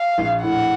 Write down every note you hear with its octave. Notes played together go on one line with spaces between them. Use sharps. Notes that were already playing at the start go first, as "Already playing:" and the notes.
Already playing: F5
A#1
A2 F#5